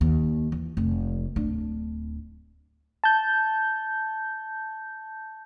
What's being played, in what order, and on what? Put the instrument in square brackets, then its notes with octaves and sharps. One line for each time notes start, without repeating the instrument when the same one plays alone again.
[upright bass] D#2
E3
F1
D1 D4
[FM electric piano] A5 G6